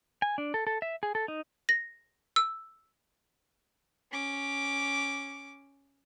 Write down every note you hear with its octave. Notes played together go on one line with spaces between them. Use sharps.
G#5
D4
A4
A4
E5
G#4
A4
D#4
A#6
E6
C#4 D6